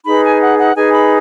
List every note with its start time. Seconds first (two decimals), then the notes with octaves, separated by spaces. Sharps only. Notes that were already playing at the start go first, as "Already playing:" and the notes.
0.05 D#4 G#4 B4 B5
0.23 G#5
0.41 F#5
0.58 F#5
0.75 D#4 G#4 B4 G#5
0.93 B5